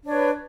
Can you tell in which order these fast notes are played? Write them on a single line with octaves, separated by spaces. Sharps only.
D4 C#5 B4